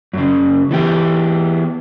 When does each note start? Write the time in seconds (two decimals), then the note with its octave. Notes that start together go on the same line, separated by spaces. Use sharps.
0.13 F#2 C#3
0.71 E3 B3 G4